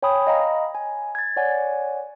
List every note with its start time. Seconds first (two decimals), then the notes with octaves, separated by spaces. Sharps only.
0.03 C#5 G5 G#5 B5 D#6
0.27 D#5 F5 A#5 B5
0.75 G#5
1.15 G#6 A6
1.37 C#5 D5 F#5 G#5